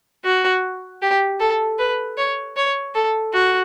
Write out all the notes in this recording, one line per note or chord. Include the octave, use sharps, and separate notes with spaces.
F#4
G4
A4
B4
C#5
C#5
A4
F#4